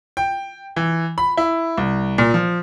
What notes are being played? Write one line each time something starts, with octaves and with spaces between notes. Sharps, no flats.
G5
E3
B5
E4
C2
A#2
F3